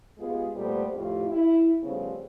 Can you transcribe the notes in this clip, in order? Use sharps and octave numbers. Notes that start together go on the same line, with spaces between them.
G#3 B3 F4 G4 G#4
A#2 G3 A3 B3 C5
F2 A2 F4 G4
E4
C#3 F3 G3 A3 B3 C4